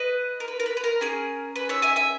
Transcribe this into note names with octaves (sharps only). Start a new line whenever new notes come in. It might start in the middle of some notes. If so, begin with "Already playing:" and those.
Already playing: B4 D#5
A#4
B4
A#4
B4
B4
A#4
C#4 G#4
B4
C#5 E5
E5 G#5
E5 G#5